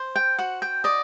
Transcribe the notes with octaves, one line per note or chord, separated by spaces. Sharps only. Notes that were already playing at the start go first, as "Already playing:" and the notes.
Already playing: C5
G5
F#4 F#5
G5
D5 D#5